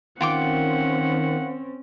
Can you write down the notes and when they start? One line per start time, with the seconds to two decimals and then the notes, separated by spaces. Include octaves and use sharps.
0.21 D#3 C4 C#4 F4 F#5 G5 D6